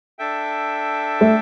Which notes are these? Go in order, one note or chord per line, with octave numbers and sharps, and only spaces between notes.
D4 A4 E5 G5
A3